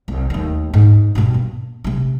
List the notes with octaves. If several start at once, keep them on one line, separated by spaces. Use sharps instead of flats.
C2
D#2 A3
G#2
G2 B2
A#3
C3 A3